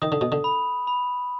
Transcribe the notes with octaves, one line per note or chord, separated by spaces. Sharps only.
D#3 D#6
D3
B2
D3
B5
B5